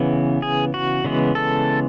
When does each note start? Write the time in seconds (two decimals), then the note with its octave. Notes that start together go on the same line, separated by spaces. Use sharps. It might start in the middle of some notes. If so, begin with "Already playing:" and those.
Already playing: C#3 E3 B3
0.42 G#4
0.74 F#4
1.04 C#3 E3 G#3 B3
1.35 A4